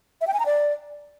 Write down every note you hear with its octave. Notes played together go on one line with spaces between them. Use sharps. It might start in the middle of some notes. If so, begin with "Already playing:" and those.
E5
G5
G#5
A#5
D5